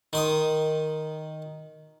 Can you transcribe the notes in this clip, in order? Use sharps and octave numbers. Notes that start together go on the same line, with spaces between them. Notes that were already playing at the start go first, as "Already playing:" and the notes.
D#3 C6 D#6